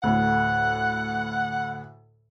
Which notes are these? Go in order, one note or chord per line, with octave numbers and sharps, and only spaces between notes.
D2 A2 F#5